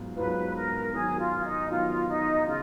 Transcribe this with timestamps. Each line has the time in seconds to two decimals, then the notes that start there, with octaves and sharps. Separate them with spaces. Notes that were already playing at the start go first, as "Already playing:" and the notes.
Already playing: G#2 F#3 B3 F4
0.16 G#2 F#3 B3 F4 B4
0.55 A#4
0.93 D#3 F#3 B3 G#4
1.18 F4
1.44 D#4
1.70 D#3 F#3 B3 F4
2.09 D#4
2.47 C#3 F4